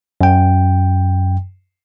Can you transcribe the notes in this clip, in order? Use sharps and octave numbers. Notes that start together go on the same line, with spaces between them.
F#2 G5